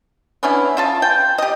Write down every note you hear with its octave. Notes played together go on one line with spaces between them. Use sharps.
B3 C#4 D4 E4
C#3 F4 A5
G5
G4 D#5